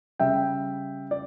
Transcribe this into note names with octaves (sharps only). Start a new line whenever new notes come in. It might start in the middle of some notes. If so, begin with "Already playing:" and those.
C#3 G3 E5 G5
D5